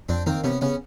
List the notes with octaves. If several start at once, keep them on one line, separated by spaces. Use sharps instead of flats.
F2 C4 D4
D#3 A#3 C4
C3 B3 C#4
C#3 B3 C#4